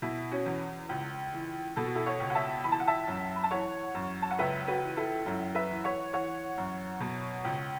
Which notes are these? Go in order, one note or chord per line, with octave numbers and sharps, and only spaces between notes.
B2 E4
C#4 F#4
E2
C#2
E3
B2 A4
F#4
E4 A4
C#5 F#5
C#2
F#5
E5 A5
E3 B5
A5
F#5
E5 A5
F#2
B5
A5
E3 C#5 F#5
F#2
A5
F#5
C#2 B4 E5
F#4 B4
E3
E4 A4
F#2 E4
B4 E5
E3
C#5 F#5
E3 C#5 F#5
F#2
B2
C#2